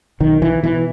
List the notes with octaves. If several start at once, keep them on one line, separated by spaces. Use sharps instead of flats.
B1 D#3
E3
B2 E3